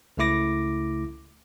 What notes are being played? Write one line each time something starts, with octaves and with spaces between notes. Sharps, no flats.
C#2 C#3 A3 E4 D6 A#6